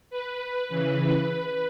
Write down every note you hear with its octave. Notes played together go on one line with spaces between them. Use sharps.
B4
C#3 E3 B4
B4